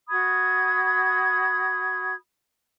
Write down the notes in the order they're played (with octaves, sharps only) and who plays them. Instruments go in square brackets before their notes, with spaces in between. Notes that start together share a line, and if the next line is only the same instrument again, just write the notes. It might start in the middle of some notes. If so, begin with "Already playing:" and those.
[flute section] F#4 B5 D#6 G#6